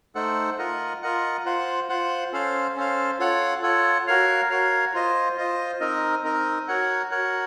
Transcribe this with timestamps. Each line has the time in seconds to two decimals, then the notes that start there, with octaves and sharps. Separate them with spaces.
0.15 A3 D#4 A4 C5 F#5
0.59 F4 A#4 D#5 F#5
1.02 F4 A#4 D#5 F#5
1.45 F4 C5 F#5
1.89 F4 C5 F#5
2.33 C#4 A4 C5 F5
2.76 C#4 A4 C5 F5
3.19 F4 A4 C#5 F#5
3.63 F4 A4 C#5 F#5
4.07 F#4 A#4 C#5 F5
4.50 F#4 A#4 C#5 F5
4.94 F4 C5 D#5
5.37 F4 C5 D#5
5.80 C4 D#4 A#4 D#5
6.23 C4 D#4 A#4 D#5
6.68 F#4 A#4 C#5 F#5
7.11 F#4 A#4 C#5 F#5